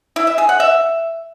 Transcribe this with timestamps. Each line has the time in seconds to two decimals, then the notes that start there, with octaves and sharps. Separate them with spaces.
0.16 E4
0.27 E5
0.38 G#4
0.49 F#5
0.60 E5